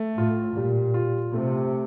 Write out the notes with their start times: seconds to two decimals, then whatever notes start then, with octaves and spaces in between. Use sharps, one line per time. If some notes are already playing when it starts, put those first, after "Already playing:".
Already playing: A3
0.17 A2 F4
0.56 A#2 G3
0.94 F4
1.34 C3 A3